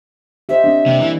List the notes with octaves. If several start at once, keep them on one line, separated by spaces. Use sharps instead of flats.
G4 C5 D#5 E5
C4 D4
C3 G3 A#3 D5
E3